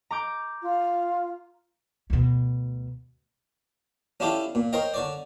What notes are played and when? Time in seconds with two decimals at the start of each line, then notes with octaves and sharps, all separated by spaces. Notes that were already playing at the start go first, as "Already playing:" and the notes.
0.11 A#5 D6 G6
0.62 F4
2.10 D2 B2
4.20 C#4 D4 E4 F4 G4 A4
4.55 A#2
4.73 A#4 C5 C#5 D#5 G5
4.94 D3 C#5 D5